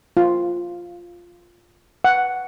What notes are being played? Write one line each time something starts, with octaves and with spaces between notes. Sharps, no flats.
F4
F#5